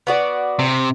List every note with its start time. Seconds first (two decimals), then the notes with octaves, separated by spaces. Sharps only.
0.07 B3 F#4 D5
0.59 C3